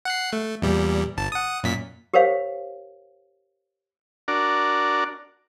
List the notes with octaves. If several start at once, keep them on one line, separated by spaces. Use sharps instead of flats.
F#5 F#6 C7
A3
E2 A#2 G3
G1 A5
F#5 D#6
F#2 A#2 B6
G4 A#4 C5 C#5 F5
D4 F#4 A#4 D5